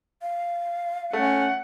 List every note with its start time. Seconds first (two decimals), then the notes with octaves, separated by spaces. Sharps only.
0.22 F5
1.13 A3 C#4 F#5